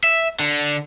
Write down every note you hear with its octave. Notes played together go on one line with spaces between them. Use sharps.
E5
D3